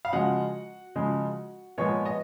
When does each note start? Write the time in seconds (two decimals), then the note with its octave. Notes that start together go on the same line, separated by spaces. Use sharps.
0.05 F5
0.13 C#3 F3 G#3 F#4 F#5
0.96 C#3 F3 G#3
1.78 A#2 F3 G#3 B3 C#5 C#6
2.05 D#5